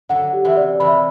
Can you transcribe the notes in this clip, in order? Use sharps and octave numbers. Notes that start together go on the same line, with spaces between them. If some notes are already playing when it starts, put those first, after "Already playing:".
D3 F#3 F#5
G4
C3 E3
D5
C3 E3 B5